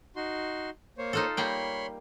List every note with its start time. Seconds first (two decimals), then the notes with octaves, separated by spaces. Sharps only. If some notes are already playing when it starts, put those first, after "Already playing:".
0.16 D#4 F#4 C6
0.98 A#3 C5 C#5
1.13 D#4 F4 A4
1.37 G3 A#3 C#5 G5 B5 C6